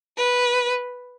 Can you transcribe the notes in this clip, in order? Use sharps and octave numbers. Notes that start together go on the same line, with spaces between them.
B4